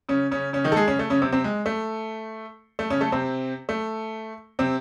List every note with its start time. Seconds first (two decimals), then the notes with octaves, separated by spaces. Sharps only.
0.09 C#3 C#4
0.31 C#3 C#4
0.53 C#3 C#4
0.64 D#3 D#4
0.72 A4
0.76 G#3 G#4
0.88 C#3 C#4
0.99 A3
1.10 C#3 C#4
1.22 C3 C4
1.32 C3 C4
1.44 G#3
1.66 A3
2.79 A3
2.90 C#3 C#4
3.01 A3 A4
3.12 C3 C4
3.69 A3
4.59 C3 C4